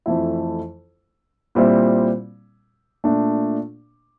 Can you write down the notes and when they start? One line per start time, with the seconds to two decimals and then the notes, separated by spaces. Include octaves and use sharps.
0.06 F2 E3 A3 E4
1.55 A#2 G3 C4 E4
3.04 A#2 A3 D4